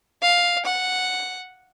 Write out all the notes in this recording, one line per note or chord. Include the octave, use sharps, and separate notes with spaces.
F5
F#5